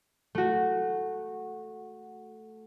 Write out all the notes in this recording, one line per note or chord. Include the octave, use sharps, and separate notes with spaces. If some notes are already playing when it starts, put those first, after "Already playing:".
A3 F#4